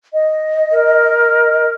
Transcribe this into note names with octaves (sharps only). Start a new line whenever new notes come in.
D#5
A#4